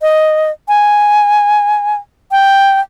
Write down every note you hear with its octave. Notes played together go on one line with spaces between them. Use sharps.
D#5
G#5
G5